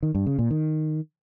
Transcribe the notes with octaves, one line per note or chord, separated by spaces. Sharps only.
D#3
G2
C#3
A#2
D#3